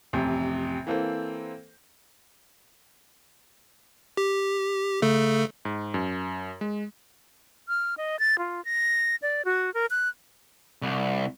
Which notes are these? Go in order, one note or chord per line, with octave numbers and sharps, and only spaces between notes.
A1 F2 C3
E3 A#3 C4 A4 C5
G4
C#3 A3 A4
G#2
F#2
G#3
F6
D#5
A6
F4
A#6
D5
F#4
A#4
F#6
C2